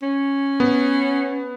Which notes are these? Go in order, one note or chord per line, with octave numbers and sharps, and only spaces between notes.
C#4
B3